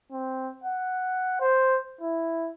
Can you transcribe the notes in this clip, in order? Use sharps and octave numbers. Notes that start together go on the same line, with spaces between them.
C4
F#5
C5
E4